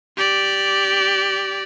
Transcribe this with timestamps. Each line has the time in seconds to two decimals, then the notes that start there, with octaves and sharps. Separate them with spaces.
0.17 G4 D5